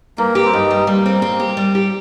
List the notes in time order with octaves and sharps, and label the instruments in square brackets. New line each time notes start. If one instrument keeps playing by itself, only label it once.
[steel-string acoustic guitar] G2 [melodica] A#3
[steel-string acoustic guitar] G4
[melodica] C4
[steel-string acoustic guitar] G2 [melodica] D#4
[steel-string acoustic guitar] G3
[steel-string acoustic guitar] G3 [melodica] A#3
[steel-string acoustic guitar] C4
C4
G4
G3
G4